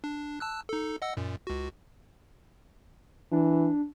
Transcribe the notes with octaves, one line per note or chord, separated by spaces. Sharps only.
D4
A5 E6 F#6
D#4 A4
D#5 F#5 E6
F#2 A#2
C#2 F#4
E3 D4